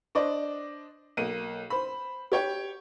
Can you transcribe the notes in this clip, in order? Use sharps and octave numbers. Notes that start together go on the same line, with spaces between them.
D4 C5 D5 D#5
B1 A#3 D#7
C5 B5
G4 C#5 G5